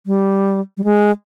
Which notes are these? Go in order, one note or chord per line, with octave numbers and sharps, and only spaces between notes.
G3
G3
G#3